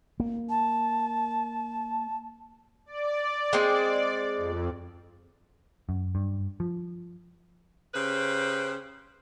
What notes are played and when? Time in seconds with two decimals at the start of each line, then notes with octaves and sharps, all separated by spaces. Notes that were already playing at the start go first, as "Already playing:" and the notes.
0.20 A#3
0.50 A5
2.86 D5
3.53 G#3 C4
4.37 F2
5.89 F#2
6.15 G2
6.60 F3
7.95 C#3 G4 B4 C5